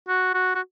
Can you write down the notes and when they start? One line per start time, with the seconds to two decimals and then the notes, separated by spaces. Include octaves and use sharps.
0.08 F#4
0.34 F#4
0.55 F#4